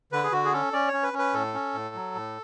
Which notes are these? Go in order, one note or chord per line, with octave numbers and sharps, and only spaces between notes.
D3 B4
G#4
D3 F#4
G#4
C#4 A4
C#4 D5
C#5
C#4
B4
C#4
B4
A2 A4
C#4
A2
F#3
A2